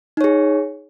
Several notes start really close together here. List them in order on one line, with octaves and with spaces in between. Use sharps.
D#4 C#5 G#4